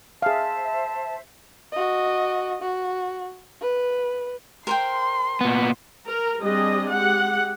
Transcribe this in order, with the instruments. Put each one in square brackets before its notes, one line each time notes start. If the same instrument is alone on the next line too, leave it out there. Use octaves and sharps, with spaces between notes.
[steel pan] G#4 F5 [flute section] C5 E5 [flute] A5
[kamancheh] F#4 D#5
F#4
B4
[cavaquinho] A#4 C5 G5 [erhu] C6
[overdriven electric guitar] A#2 B3
[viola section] A#4
G3 C4 D4 G#4 D#5
G#3 G4 F#5